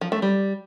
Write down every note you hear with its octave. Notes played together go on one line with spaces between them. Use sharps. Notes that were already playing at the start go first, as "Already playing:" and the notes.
F3
A3
G3